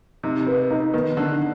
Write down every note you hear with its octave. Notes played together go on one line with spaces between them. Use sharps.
C3 D#4
B4
D#4
D#3 B3
D3 D4